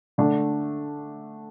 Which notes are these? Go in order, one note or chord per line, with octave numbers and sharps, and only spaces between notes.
D3 A3 D4